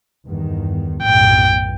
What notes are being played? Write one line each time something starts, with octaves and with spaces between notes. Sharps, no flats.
E2 G2 D#3
B1 F#2 A2 G5